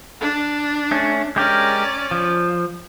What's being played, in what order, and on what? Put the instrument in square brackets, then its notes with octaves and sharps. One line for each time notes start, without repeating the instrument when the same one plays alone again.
[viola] D4
[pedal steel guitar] A3 C#4
[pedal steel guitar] G#3 G4 A#4 [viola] C#4 D5
[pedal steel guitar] F3